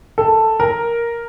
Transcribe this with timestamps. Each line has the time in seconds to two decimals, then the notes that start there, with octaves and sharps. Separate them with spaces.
0.18 A4
0.60 A#4